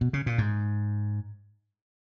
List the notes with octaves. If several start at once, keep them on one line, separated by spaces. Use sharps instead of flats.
B2
C#3
A#2
G#2